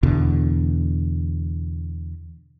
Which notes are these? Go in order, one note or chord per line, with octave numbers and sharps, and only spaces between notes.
E2 B2 D3